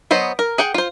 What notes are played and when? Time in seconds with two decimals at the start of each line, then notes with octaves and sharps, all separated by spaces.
0.11 F#3 B3 C5 D#5
0.39 A#4
0.58 G#4 F#5 G5
0.74 F4 C5